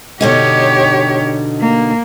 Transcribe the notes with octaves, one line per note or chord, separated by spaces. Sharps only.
B2 D3 D#4 G4 C#5
A#3